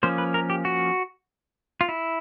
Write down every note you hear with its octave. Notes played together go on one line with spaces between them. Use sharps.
F3 A#3 C#4 C5
B4
A#4
G4
F#4
F4
E4